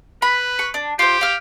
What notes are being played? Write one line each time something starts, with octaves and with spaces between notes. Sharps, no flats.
B4 B5
C#6
D4
F4 G4 C5
F5 F6